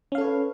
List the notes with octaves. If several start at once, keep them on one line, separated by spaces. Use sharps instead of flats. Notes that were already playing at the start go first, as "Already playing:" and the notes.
C#4 A4 B4 C#5 F5